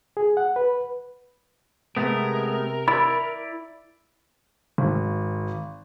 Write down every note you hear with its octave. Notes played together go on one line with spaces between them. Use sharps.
G#4
F#5
B4
C3 G#3 A3 B3 A#4
E4 D5 B5
G#1